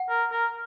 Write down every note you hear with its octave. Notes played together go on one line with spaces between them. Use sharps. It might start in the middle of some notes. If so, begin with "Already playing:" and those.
Already playing: F#5
A#4
A#4